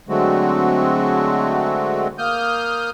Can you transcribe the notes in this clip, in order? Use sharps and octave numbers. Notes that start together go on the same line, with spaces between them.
D3 F#3 G#3 A3 C4 F#4
A#3 D#6 F6 G6